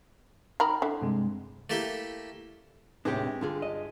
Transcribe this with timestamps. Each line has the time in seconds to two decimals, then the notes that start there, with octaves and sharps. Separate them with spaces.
0.60 D#3 A#4 B5
0.82 D3 E4
1.01 G2 C3 G#3
1.70 A3 A#3 E4 G4
3.05 D#2 A2 C3 G#3 D4 G4 B4
3.41 G2 D3 F4 G#4
3.62 D#5